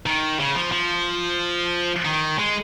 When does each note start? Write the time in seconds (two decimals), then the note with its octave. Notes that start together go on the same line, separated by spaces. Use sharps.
0.06 D#3
0.40 C#3
0.56 F3
0.72 F3
2.05 D#3
2.39 G#3